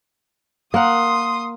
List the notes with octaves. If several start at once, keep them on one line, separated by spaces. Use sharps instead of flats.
A#3 F#5 C6 D#6